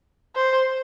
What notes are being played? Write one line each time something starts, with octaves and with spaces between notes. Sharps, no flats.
C5